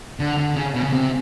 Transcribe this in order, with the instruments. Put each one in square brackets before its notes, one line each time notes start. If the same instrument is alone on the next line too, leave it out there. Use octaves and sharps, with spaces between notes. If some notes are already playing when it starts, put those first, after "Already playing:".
[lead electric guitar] D3
D3
C#3
B2
C#3
C3